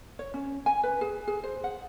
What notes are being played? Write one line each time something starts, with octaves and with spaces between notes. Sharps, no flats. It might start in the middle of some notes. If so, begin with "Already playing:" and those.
C#5
C#4
G#5
B4
G#4
G#4
C5
F#5